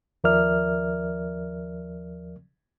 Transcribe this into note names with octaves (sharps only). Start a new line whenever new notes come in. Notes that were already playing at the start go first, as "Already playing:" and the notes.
D#2 F3 A#4 D5 E5 F6